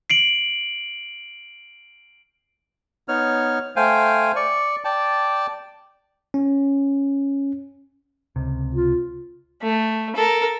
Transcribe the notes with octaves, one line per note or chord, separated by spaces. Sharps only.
C7 D7 F#7
B3 D#4 C#5 F6
A3 C5 F5 G5 G#5
D5 C#6
D5 G5 A5
C#4
C#2 C3
F4
A3
A4 A#4